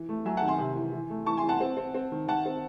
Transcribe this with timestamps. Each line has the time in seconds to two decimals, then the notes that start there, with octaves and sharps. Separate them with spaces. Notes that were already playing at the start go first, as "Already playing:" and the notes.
Already playing: E3
0.09 A3
0.25 F#3 E5 G#5
0.37 D#3 F#5 A5
0.48 G#5 C6
0.59 C3
0.75 E3
0.93 E3
1.10 A3
1.26 E3 A5 C#6
1.37 G#5 C6
1.43 E3
1.49 F#5 A5
1.61 C4
1.77 C4
1.95 C4
2.12 D#3
2.27 D#3 F#5 A5
2.46 C4